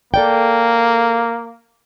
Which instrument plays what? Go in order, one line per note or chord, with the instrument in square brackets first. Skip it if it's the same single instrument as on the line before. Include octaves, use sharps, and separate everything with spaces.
[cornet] A#3 [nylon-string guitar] A4 D5 G5